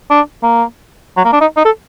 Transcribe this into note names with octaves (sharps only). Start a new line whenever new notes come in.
D4
A#3
F#3
A#3
D4
D#4
D#4
A4